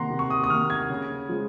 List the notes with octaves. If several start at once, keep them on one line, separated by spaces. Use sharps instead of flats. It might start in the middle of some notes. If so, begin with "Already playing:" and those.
Already playing: C3 D#3 A#3 F#5 A#5 C6
C3
C#6
D#6
D#6
D#3 A#3 F6
G#6
C#3
F3 G#3